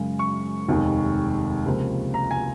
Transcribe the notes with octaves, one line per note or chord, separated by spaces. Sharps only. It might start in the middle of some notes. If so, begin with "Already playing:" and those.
Already playing: F#2 C#3 G#3
C#6
F1 D#2 D#3 G#3 D#4
C#2 C3 F3 A#3
A#5
G#5